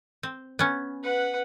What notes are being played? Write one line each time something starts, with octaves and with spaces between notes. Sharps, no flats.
C4
B3 C#4
B4 F#5